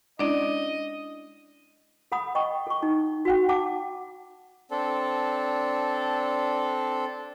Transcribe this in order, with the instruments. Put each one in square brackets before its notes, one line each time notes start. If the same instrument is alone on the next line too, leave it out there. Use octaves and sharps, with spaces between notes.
[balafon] G#3 C#4 E4 [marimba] D4 D5 [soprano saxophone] D#5
[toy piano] A4 F#5 B5 D#6
D#5 G5 C#6
A4 C#6
D#4
F#4 F#5 G5
F#5 A5 D6
[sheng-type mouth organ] C4 D4 A4